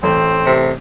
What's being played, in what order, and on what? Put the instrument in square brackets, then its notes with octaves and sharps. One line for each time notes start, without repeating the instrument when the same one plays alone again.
[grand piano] A1 A3 [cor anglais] C4
[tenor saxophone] C3